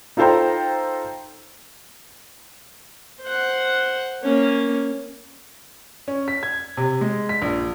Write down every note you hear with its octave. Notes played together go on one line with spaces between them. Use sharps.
D#4 F4 A4 C5 G5 A#5
C5 F#5
A#3 C#4
C#4
B6
G#6
C3
G#3
B6
A#1